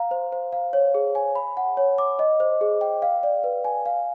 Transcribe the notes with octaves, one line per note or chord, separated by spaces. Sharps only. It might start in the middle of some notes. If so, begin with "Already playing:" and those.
Already playing: F5 A#5
C5
C5
F5
C#5
G#4
G#5
B5
F#5
C#5
D6
D#5
C5
G#4
G5
F5
D5
B4
G#5
F5